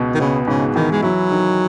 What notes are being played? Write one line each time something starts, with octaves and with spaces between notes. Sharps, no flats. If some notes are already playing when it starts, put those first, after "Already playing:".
Already playing: C#2 B2
D#3
C#3 B3
G#2 C#3
D#3 E3
G#3
F#3 E4
D#3